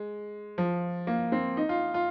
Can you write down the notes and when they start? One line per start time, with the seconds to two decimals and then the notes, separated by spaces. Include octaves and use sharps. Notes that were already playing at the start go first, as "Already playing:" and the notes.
Already playing: G#3
0.58 F3
1.07 A#3
1.32 C4
1.57 D#4
1.69 F4
1.94 F4